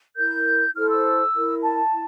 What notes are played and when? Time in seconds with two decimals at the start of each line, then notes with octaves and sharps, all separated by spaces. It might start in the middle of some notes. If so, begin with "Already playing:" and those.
0.17 E4 A#4 G6
0.75 E4 A4 C5 F6
0.89 E6
1.34 E4 A#4
1.62 A5
1.92 E4